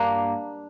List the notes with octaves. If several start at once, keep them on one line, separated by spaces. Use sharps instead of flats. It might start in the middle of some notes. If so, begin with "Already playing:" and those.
Already playing: G2 A#3 D4